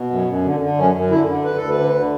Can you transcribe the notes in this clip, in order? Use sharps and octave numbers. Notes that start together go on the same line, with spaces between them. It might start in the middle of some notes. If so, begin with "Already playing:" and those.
Already playing: B2
F#2
F#2
D3
D3
F#2 C#4
F#2
D3 E4
D3
D2 B4
D2 A4
B4
D3
D3